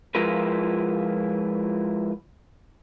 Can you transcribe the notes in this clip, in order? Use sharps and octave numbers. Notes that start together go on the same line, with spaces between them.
F3 G#3 E4 F4 A#4 B4